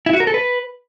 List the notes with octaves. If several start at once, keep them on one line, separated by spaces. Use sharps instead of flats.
E4
F#4
A#4
A4
B4